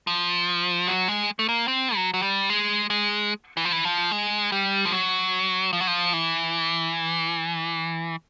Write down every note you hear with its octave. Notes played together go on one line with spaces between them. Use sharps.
F3
F#3
G#3
A3
A#3
C4
F#3
F#3
G3
G#3
G#3
E3
F3
E3
F3
G#3
G3
F3
F#3
F3
F#3
F3
E3